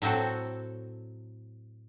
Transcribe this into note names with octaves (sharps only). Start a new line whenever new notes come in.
A2 F#3 C4 F#4 A4